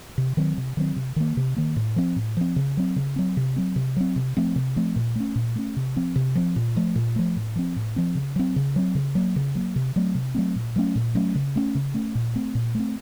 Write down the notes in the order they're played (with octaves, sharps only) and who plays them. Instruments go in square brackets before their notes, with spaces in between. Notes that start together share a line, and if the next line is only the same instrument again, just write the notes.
[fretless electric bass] C3
D#3 F#3 C4
C3
D#3 F#3 C4
C3
D#3 A#3
C3
D#3 A#3
A2
F3 C4
A2
F3 C4
C#3
F#3 C4
C#3
F#3 C4
C3
F#3 C4
C3
F#3 C4
C3
F3 A3 C4
C3
F3 A3 C4
A#2
A3 C#4
A#2
A3 C#4
C3
F3 C4
C3
F3 C4
A#2
F3 A3
A#2
F3 A3
A2
F3 C4
A2
F3 C4
C#3
F#3 C4
C#3
F#3 C4
C#3
F#3 A#3
C#3
F#3 A#3
C3
F#3 A3 C4
C3
F#3 A3 C4
A#2
F#3 A3 C#4
A#2
F#3 A3 C#4
C#3
A3 C#4
C#3
A3 C#4
A#2
A3 C4
A#2
A3 C4